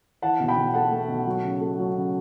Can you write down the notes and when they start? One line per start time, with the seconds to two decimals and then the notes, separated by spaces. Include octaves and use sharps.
0.22 E3 F#5 A5
0.40 B1
0.48 G5 B5
0.57 B1
0.74 A3 F#5 A5
0.92 A3
1.08 B1
1.27 F#3
1.43 C#3
1.61 A3
1.79 F#3
1.95 C#3